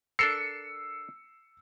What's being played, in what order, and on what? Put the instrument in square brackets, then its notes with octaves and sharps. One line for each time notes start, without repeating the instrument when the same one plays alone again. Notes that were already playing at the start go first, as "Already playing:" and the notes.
[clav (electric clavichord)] D4 A4 A#4 [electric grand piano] E6 C7 C#7